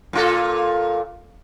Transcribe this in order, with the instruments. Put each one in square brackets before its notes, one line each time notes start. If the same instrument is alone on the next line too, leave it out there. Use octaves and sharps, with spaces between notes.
[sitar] A#2 F4 A4